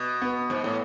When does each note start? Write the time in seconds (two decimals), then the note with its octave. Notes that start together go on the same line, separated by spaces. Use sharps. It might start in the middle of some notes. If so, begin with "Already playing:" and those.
Already playing: B2
0.22 B3
0.50 G#2
0.64 A2